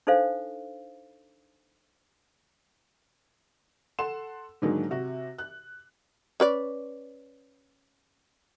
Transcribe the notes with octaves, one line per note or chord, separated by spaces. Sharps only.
D4 D#4 A4 C5 F5
A4 F#5 C6 E7
G#2 D3 D#3 F#3 G#3 A#3
C3 F#4
F#6
C#4 B4 D5